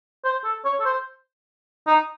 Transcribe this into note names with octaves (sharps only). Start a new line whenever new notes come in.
C5
A4
C#5
A4
C5
D#4